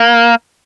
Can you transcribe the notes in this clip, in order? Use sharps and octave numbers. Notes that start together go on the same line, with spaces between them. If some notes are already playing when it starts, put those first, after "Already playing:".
Already playing: A#3